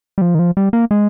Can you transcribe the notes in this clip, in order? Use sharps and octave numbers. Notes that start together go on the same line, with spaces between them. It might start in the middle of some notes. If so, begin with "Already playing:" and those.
G3
F3
D#3
F3
G3
A#3
G#3